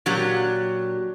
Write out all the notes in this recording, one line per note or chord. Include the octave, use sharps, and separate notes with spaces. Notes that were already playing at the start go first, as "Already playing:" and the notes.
A#2 F#3 D4 G4